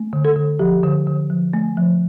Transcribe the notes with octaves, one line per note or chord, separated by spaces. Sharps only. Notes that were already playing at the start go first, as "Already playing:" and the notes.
Already playing: A3
D3
A4
D3
F3 G4
D3
D3
F3
A3
F3